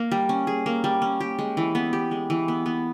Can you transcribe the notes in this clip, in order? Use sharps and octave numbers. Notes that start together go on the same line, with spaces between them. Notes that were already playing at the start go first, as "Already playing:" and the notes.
Already playing: A#3
G3
C#4
G#4
A#3
G3
C#4
G4
G#3
E3
B3
G4
G#3
E3
B3
B3